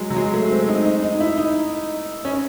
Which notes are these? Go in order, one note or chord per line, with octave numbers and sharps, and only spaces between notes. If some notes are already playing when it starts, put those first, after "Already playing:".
Already playing: F#3 G#3
F#3
G#3
A3
C4
D#4
D#4
D#4
E4
D#4
C#4